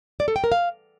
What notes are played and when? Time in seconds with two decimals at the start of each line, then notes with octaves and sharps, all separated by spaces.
0.20 D5
0.28 A4
0.36 G5
0.44 A#4
0.52 F5